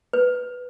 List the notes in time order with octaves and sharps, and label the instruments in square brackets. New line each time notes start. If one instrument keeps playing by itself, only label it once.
[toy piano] B4